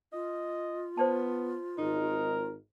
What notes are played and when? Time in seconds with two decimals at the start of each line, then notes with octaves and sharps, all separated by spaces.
0.13 F4 D#5
0.97 B3 C5 D5 A5
1.78 G#1 D#4 A#4